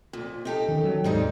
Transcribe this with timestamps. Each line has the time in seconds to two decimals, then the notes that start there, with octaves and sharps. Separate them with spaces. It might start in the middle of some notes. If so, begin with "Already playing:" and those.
0.13 F2 A#2
0.45 D#4 G4 A4
0.68 D#3 C#4
0.84 F#3 G3
1.04 D#2 G#2 C3 G3 D#4